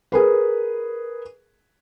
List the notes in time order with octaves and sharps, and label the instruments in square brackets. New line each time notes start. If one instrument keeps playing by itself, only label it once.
[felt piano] G#4 A#4 B4